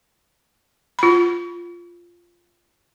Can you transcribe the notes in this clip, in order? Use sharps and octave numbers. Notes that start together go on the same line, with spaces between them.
F4 B5